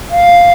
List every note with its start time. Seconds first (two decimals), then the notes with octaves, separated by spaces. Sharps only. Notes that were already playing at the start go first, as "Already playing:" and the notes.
0.10 F5